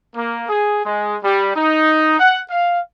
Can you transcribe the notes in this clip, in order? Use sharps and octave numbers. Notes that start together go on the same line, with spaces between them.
A#3
G#4
G#3
G3
D#4
F#5
F5